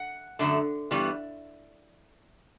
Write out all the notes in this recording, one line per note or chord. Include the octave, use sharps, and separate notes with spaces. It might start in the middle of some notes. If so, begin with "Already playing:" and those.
Already playing: F#5
F#2 D3 A3
G2 E3 G3 B3